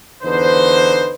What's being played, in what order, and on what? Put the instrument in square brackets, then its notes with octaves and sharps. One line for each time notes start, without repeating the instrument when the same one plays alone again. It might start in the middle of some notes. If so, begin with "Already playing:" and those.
[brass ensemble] E2 D3 D#4 B4 C5